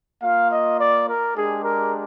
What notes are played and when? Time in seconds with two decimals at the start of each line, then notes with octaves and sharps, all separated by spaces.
0.22 A#3 F4 F5
0.51 D#5
0.79 D5
1.07 A#4
1.34 G#3 D4 G4 G#4
1.63 A#4